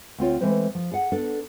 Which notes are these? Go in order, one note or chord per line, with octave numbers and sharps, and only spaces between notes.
D2 C4 F4 C#5
E3 G#3 A3 C4 B4 C5
F3
G#4 F#5
B3 D4 A4